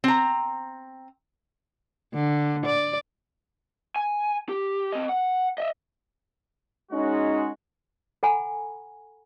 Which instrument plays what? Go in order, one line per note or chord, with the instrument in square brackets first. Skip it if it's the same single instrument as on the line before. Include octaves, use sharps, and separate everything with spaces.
[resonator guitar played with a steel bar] C4 A#5
[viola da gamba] D3
D5
[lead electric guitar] G#5
G4
C4 D#5
F#5
D#5 E5
[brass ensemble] G#3 C#4 D#4 F#4
[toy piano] A4 F#5 G#5 A#5 B5